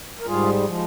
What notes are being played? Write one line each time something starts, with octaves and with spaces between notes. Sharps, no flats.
A#4
G#2 G3 F4 G#4
F3 G#3